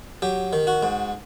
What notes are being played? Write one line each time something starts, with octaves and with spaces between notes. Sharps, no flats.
F#3 G4
D#3
F#4
G#2